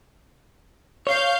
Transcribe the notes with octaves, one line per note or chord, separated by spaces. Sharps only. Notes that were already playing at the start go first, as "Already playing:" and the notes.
C#5 F5 G6